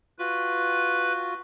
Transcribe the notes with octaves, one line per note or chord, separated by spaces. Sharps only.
F4 F#4 B4